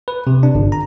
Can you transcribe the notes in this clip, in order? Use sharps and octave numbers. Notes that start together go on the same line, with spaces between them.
B4
C3
D4
G1
A#5